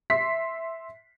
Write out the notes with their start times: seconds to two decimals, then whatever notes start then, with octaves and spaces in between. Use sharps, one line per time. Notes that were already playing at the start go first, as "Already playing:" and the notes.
0.10 E5 C6 B6 C7